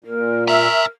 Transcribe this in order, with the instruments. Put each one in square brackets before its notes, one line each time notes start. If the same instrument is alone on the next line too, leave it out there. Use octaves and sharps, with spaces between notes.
[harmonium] A#2 [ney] A#4
[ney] A#4 [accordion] E5 [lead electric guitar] G#5 A#5